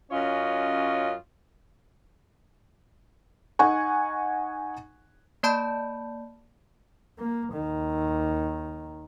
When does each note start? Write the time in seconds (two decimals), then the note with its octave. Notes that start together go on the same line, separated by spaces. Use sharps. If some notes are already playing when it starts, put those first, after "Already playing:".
0.11 F#2 C#4 F4 C#5 D#5
3.59 D#4 F#5 G#5 C#6
5.43 A#3 D5 A5 B5 G6
7.18 A#3
7.53 D#2 D#3